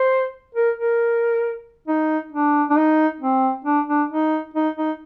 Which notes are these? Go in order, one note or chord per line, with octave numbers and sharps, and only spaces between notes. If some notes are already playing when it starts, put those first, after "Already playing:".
Already playing: C5
A#4
A#4
D#4
D4
D4
D#4
C4
D4
D4
D#4
D#4
D#4